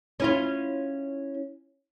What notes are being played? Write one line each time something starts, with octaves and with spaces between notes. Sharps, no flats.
C#4 E4 F4